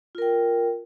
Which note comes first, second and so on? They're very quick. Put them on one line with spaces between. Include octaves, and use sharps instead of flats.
F4 A#4 G5